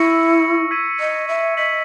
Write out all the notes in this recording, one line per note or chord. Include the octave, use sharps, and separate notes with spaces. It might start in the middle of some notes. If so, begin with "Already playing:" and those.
Already playing: E4 C#6 E6 A#6 C#7
E6 G#6 B6 D#7
D#5
E5
D#5 C#6 G#6 B6 F#7